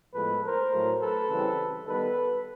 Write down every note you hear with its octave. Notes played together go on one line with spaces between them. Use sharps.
A2 F3 G#3 B3 A4 B4
A#4 C5
A2 F#3 A3
A4 B4
C#3 E3 G3 C4
D#3 G3 B3 A4 B4